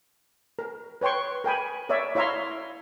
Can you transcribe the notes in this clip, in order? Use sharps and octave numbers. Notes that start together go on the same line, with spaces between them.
A#4
B4 C#5 G5 C6 C#6
A#4 G5 G#5 B5
A#4 C#5 D5 E5
E4 C#5 E5 F5 A#5 C6